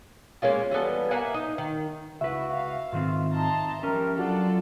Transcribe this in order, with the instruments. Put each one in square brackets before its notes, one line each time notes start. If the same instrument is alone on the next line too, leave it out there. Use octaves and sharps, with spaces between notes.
[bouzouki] G#3 A#3 C#4 F4
E3 G3 B3 A4
A#3 E5 F#5 G#5
D#4
D#3
[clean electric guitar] C#2 B4 [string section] E4 [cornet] F#4 [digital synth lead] E5
[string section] F5
[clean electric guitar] G#2 D#3 C4 [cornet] F4
[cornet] D#4 [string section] A5 A#5 C6
[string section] F3 G3 [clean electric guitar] C#4 [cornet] A#4
[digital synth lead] F#3 [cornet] D4 [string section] F4 A4 D5